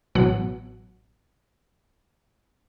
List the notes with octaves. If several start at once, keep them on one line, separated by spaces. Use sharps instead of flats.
A1 B2 F#3 F#5